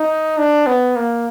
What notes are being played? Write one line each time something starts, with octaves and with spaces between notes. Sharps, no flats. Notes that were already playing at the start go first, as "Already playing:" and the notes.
Already playing: D#4
D4
B3
A#3